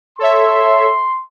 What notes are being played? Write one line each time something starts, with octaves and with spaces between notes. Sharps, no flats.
A4 C#5 E5 C6